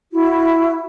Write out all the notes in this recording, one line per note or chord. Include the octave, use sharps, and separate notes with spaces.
E4 F#4